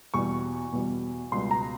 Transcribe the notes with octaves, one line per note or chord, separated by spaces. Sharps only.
E2 B2 G3 C#6
E2 B2 G3
C#2 B2 G3 C6
A#5